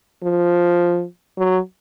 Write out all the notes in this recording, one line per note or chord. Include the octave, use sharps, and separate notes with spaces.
F3
F#3